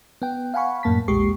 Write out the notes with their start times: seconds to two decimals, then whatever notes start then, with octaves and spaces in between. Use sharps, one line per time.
0.22 B3 G5
0.54 F5 F#5 G#5 B5 C#6
0.83 F#2 A2 A#3 A5 B6
1.08 A#1 E2 G#3 G4 C#6 C7